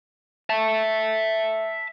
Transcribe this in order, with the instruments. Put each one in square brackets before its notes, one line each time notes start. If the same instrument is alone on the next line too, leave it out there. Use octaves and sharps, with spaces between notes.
[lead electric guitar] E5 A5